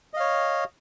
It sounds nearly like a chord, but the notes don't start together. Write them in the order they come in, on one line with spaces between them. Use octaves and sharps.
D#5 F5 C#5